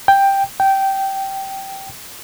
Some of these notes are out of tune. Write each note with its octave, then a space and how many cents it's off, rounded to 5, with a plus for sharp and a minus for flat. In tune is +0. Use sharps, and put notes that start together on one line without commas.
G5 +5
G5 -15